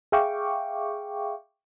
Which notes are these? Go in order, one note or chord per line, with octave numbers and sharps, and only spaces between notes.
G#4 E5 F5 G5 C#6 D6